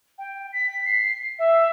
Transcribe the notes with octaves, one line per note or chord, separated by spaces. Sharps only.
G5
B6
C7
E5